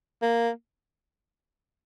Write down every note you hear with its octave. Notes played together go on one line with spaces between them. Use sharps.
A#3